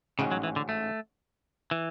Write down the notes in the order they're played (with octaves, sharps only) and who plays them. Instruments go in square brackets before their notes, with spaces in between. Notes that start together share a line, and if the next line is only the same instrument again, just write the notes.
[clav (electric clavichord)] A1 G#2 G#3 C#4 F#4 [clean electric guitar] C#3
[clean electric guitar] F#3
E3
D3
A3
E3